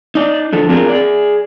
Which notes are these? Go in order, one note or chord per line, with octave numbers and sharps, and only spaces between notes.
D#4 D5
D3 F3 A4
C4 D4 F4 G#4 A#4
G#4 D5